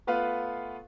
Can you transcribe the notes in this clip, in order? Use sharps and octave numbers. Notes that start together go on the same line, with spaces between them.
A3 B3 F4 B4 F5